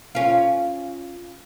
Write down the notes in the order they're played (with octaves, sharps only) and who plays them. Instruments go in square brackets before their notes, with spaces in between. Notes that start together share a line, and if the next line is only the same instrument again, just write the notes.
[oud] C#4 F4